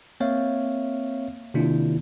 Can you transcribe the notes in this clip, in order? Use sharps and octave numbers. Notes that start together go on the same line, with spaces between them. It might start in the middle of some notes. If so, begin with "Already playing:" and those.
A#3 C4 C#5 E5 F5
C3 D#3 A#3 D4 E4 F4